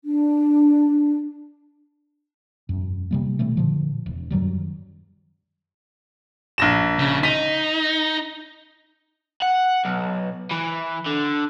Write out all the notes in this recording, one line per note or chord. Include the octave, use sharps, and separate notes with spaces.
D4
E1 F#2
C3 G3 A#3
B2 D#3 G3 A3
A#2 D3 F3
E1
F#2 D#3 F#3 G3
A#1 A#6 E7
C#3
D#4 B6 D#7
F#5
B1
E3
D3